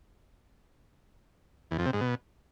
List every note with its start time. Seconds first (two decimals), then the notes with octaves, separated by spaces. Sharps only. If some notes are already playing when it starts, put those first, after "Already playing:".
1.71 E2
1.78 F2
1.86 C3
1.93 G#2
2.01 B2